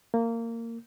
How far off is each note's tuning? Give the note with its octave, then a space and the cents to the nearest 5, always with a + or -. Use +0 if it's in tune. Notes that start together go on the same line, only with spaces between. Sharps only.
A#3 -20